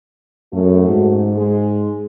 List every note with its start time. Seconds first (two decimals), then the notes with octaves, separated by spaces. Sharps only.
0.54 F#2 A3 F#4
0.88 G#2
1.36 G#3